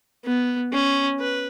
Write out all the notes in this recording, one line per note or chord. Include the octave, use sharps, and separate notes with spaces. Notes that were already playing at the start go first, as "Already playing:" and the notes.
B3
C#4
B4